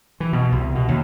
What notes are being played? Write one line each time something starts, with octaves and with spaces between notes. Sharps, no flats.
E3
B2
C2
B2
D#2